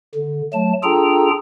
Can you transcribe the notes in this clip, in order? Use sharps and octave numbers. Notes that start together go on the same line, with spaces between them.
D3
F#3 A3 A5
D4 F4 G#4 A4 G5 A#5